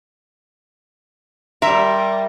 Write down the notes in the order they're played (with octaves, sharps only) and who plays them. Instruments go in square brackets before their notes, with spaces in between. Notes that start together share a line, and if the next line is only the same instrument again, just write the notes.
[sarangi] G3 [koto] A#4 [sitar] E5 [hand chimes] C6